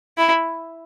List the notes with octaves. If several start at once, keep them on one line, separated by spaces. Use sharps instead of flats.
E4